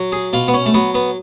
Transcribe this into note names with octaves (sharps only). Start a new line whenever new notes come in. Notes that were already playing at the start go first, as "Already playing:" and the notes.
Already playing: F#3
G#4
B2 F4
B3
C#4
A3
F#3 B3
B3